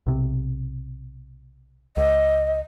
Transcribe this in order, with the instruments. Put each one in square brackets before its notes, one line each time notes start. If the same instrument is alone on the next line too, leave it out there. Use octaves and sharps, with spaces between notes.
[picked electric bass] B1 C3
[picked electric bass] C#2 [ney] D#5